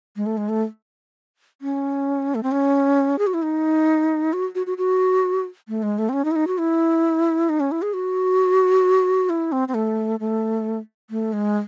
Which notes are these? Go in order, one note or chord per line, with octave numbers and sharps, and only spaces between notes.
G#3
A3
G#3
A3
C#4
A3
C4
C#4
G#4
F#4
E4
D#4
F#4
F#4
F#4
F#4
A3
G#3
A3
C4
C#4
D#4
E4
D#4
F#4
E4
D#4
C#4
E4
G#4
F#4
E4
C4
C4
A3
A3
A3
G#3